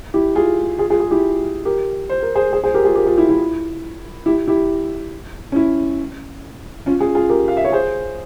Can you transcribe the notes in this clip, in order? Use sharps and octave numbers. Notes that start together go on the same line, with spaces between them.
E4 G4
F4 G#4
F4 G#4
F4 G#4
F4 G#4
E4 G4
G4 A#4
C5
A#4
G#4 C5
G#4 C5
G#4 C5
G4 A#4
F4 G#4
G4 A#4
F4 G#4
E4 G4
E4
E4 G4
E4 G4
C#4
E4
C#4 F4
F4 G#4
F4 G#4
G4 A#4
F5
E5
C#5
G#4 C5